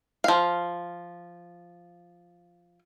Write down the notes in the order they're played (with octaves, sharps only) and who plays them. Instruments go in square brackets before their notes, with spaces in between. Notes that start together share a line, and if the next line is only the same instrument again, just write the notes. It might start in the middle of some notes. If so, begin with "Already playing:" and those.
[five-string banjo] F3 F5